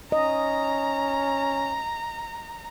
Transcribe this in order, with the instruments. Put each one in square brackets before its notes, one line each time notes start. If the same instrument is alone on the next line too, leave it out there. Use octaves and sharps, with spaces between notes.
[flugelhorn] C#4 [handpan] D#5 [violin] A#5